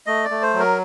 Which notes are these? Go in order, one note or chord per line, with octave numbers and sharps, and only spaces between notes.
A3 D#5
D5
A3
C5
F#3
A#4